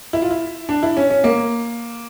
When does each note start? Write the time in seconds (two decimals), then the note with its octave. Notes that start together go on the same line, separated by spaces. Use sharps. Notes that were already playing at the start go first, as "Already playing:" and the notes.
0.13 E4
0.22 F4
0.31 E4
0.69 D4
0.83 E4
0.97 C#4
1.10 C#4
1.24 A#3